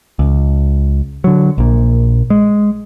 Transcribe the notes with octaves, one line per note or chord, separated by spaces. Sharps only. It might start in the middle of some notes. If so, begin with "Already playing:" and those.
C#2
D3 F#3
A#1 A#2
G#3